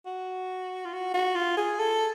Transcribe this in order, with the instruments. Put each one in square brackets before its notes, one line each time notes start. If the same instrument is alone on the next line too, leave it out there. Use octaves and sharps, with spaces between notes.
[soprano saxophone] F#4
F4
F#4
F#4
F4
G#4
A4